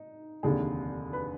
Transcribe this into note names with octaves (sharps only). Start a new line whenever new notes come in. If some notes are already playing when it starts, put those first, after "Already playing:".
Already playing: D#4
F1 D#2 D3 G#4
B4